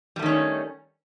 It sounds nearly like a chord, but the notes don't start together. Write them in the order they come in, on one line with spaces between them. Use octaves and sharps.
G3 A3 D#3 C#4